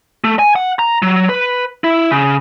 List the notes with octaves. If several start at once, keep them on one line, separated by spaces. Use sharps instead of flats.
A3
G#5
F#5
A#5
F#3
B4
E4
C#3